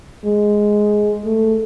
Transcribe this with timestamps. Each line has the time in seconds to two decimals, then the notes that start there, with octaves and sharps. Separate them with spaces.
0.25 G#3
1.25 A3